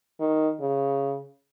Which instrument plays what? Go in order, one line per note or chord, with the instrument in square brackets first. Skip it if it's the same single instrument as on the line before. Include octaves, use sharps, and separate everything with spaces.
[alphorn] D#3
C#3